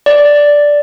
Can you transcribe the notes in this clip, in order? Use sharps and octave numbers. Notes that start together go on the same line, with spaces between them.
D5